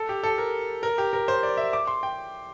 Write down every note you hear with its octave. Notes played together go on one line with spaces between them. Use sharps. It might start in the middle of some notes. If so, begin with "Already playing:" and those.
Already playing: A4
G4
A4
A#4
A#4
G4
A#4
C5
D5
E5
D6
C6
G5